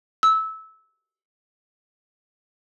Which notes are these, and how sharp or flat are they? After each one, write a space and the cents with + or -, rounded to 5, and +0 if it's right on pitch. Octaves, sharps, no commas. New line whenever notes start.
E6 -20